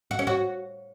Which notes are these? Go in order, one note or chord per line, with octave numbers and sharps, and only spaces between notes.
F#4
C#4
F#4